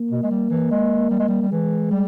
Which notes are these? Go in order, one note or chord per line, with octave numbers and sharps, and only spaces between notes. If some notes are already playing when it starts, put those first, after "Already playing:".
Already playing: A#3
B2
G#3
G3
E3
G#3
G3
G#3
G3
G3
E3 G#3
G3